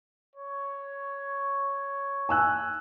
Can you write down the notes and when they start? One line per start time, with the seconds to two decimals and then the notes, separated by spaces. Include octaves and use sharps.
0.36 C#5
2.29 G#5 E6 F#6